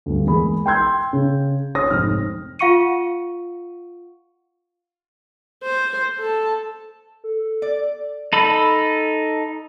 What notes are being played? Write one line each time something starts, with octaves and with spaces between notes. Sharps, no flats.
D2 G2
E2 G#3 A#3 G#4 B5
G5 A#5 C6 E6 G6 G#6
C#3
C#5 D#6 A#6
F1 G#2 C4 F6
F4 F5 F#5 C#6 C#7 D#7
C5
A4 A5
A4
D5
D#4 A4 B5 E6